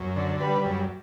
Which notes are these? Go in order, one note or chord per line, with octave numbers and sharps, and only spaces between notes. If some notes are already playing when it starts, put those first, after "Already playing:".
Already playing: F#2
D3
G3 B4
F#2